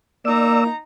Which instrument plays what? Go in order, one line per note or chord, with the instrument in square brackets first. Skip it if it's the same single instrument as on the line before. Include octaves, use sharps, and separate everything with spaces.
[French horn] A#3 [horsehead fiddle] D#4 A#5 [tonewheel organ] D5 E6